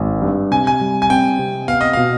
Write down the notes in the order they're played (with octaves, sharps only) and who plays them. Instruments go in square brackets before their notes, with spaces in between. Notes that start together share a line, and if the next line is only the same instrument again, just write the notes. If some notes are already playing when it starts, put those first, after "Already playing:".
Already playing: [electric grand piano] G#1
G2
[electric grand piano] C3 [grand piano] G#5
[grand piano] G#5
[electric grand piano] G3
[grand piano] G#5
[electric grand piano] C4 [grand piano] G5
[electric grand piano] C3
[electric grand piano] B3 [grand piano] F5
[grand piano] D#5
[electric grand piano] B2 [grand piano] F5